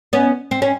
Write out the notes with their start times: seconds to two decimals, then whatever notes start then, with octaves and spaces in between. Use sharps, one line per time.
0.13 B3 C#4
0.51 C4
0.62 C#4